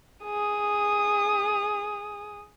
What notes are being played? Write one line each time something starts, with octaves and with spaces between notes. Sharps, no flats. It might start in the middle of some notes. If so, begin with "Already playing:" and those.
G#4 D#6